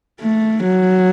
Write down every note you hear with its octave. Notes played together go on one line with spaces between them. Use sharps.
A3
F#3